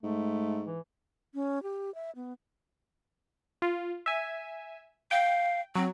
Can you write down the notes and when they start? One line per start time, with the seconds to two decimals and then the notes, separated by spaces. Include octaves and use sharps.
0.03 G#2 A3
0.67 E3
1.35 C#4
1.63 G4
1.95 E5
2.16 B3
3.62 F4
4.06 E5 G#5
5.11 F5 G5
5.75 F#3 C4